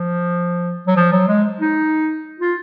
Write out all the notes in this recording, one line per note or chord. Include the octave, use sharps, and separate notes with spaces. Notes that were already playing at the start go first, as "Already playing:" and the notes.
Already playing: F3
F#3
F3
F#3
G#3
D#4
F4